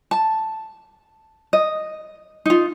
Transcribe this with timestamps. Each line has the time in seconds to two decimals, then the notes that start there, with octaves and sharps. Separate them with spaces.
0.11 A5
1.53 D#5
2.46 D#4 F4